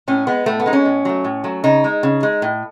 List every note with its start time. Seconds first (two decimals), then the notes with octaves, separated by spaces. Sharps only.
0.08 A2 C#4
0.27 G#3 B3
0.46 A2 A3
0.60 B3
0.66 G#3 D#4
0.73 C#4
0.85 A2
1.05 F#3 A3
1.24 A2
1.44 F#3 A3
1.64 C#3 D#4
1.84 G#3
2.03 C#3
2.23 G#3
2.42 A2